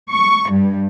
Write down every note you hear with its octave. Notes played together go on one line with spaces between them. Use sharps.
C#6
G2